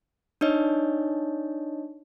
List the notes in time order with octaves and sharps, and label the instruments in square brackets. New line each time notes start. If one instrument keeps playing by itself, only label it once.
[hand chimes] D4 D#4 C#5 D#5